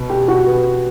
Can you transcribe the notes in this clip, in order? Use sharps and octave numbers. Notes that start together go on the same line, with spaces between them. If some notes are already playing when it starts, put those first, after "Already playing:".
Already playing: B2
G4
F#4
B4